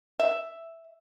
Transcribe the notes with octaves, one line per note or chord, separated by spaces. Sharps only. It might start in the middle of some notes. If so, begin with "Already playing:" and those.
E5